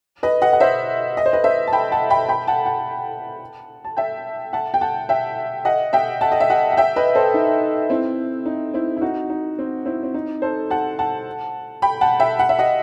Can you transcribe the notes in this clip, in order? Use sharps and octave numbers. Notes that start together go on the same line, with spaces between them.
B4 D#5
D#5 F#5
F#5
C5 E5
D#5
C5
B4 D#5
C5 E5
A5
G5 B5
F#5 A5
G5 B5
G5 B5
F#5 A5
F#5 A5
A5
E5 G5
F#5 A5
G5
F#5 A5
E5 G5
D#5 F#5
E5 G5
F#5 A5
D#5
E5
D#5 F#5
F#5
E5 G5
B4 D#5
A4 C5
D#4
C4 E4
D#4
C4 E4
E4
D#4 F#4
D#4
C4
C4 E4
C4
D#4
A4 C5
F#5 A5
F#5 A5
G5 B5
F#5 A5
E5 G5
F#5
E5
D#5 F#5